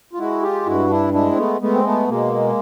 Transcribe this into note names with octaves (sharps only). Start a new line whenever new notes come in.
F4
G#3 E4 F#4
F4 G4
G2 E4 F#4
D4 E4
G#3 D4 E4
C4
A3 B3
G#3 A3 B3
C4
A3 B3
B2 G#3 A#3